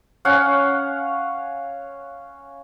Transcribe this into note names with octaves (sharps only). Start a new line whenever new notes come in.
C#4 F5 F#5